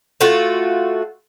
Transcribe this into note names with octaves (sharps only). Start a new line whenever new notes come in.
A3 F4 F#4